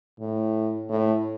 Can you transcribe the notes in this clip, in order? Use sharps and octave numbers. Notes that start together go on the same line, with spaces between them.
A2
A2